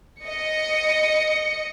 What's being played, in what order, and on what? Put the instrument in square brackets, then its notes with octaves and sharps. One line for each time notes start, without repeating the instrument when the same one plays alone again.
[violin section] D#5 C#7